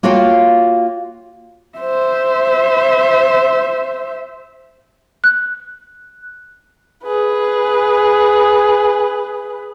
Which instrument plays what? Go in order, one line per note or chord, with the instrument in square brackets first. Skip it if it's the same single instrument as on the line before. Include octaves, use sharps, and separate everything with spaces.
[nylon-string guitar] A#3 F4 F#4 C#5 F5 G5
[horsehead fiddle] C5 E5
[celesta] F#6
[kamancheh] G#4 B4